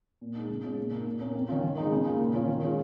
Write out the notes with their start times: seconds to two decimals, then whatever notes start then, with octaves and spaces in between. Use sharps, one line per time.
0.21 A#2
0.36 G#3 D#4
0.50 C#3
0.64 G#3 C#4 F4
0.77 A#2
0.91 A#3 D#4
1.06 A#2
1.20 A#3 C#4
1.35 F2
1.48 D#3 C#4 F4
1.63 D#3
1.78 G#3 D#4
1.92 C#3
2.05 A#3 F4
2.20 A#2
2.34 F3 C#4 F4
2.48 D#3
2.63 G#3 C#4 F4